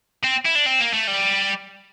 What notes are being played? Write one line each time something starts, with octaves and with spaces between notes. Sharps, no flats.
C4
E4
D4
C4
A#3
A3
G3